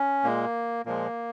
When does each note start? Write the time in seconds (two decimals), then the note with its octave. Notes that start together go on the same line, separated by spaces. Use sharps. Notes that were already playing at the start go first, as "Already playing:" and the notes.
Already playing: C#4
0.24 A#2 G#3 A#3
0.86 A#2 F3 G#3 A#3